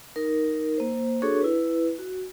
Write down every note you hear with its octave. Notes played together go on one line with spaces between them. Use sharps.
D#4 A#4
A#3 C5
D4 F#4 G#4 A4 C#5 C#6
E4 B4
F#4